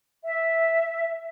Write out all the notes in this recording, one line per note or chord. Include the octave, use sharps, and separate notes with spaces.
E5